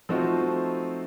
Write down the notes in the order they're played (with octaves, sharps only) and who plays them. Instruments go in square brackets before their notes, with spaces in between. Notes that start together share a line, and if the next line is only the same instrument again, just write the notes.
[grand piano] F3 A3 C4 D#4 F#4